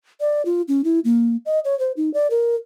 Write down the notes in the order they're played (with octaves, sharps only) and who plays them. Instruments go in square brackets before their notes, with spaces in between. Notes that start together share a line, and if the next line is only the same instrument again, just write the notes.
[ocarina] D5
F4
C#4
E4
A#3
D#5
C#5
C5
D#4
D5
A#4